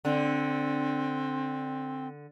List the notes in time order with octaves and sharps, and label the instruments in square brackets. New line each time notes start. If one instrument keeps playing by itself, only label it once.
[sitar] D3 [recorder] C4